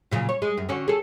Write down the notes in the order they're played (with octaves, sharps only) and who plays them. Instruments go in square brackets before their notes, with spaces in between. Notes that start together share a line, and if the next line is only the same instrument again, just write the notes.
[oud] A#2 C#3 F#3
C#5
G#3
F#2
D3 C#4 F#4
G#4 A4